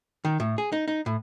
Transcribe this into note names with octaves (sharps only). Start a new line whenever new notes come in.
D#3
A2
G#4
D#4
D#4
A2